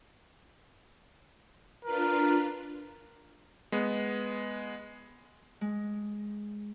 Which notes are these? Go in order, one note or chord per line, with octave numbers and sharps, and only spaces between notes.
D4 F4 A#4 B4
G#3 B3
G#3